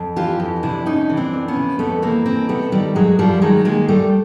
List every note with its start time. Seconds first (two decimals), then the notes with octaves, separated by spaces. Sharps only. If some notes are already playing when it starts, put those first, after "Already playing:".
Already playing: F2
0.16 E3 F4 G4
0.40 F2
0.63 C3 D4 E4
0.86 F2 C#4 D#4
1.09 E3
1.17 C4 D4
1.33 F2
1.48 B3 C#4
1.56 C3
1.79 F2 A3 B3
2.02 E3 A#3 C4
2.25 F2 A#3 C4
2.49 C3 A3 B3
2.72 D#3 G3 A3
2.95 F#2 F#3 G#3
3.19 F#2 F3 G3
3.42 D#3 F#3 G#3
3.65 D#3 G#3 A#3
3.88 F#2 G3 A3